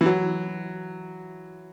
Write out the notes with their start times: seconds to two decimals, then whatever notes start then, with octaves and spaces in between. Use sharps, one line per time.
0.01 E3
0.06 F#3